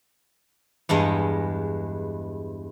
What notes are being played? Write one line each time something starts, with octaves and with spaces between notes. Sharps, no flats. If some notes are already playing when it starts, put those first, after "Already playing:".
E2 G2 G#3 D#5